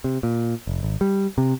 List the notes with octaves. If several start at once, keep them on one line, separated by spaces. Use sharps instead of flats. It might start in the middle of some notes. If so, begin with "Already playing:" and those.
C3
A#2
F1
G#1
G3
C3